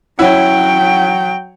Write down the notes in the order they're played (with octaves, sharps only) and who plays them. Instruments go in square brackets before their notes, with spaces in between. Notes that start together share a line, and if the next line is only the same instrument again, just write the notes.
[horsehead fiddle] F#3 G5 [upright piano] C#4 E4 F#5